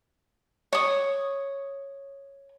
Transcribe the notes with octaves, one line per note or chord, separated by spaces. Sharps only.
C#5 D#6